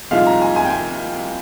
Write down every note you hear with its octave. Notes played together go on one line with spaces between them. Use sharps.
C2 A#2 F3 G#3 D#4 F5
A#5
G#5
G#5
G5
G#5